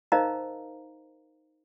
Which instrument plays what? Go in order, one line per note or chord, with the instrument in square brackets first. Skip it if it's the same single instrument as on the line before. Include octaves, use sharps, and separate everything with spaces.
[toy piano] D#4 A#4 C5 D#5 F5 A#5